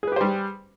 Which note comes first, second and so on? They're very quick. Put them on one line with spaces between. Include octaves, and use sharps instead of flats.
G#4 B4 G4 C5 G3